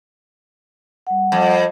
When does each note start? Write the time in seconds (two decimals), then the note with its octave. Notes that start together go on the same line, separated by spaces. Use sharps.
1.07 G3 F#5
1.32 F2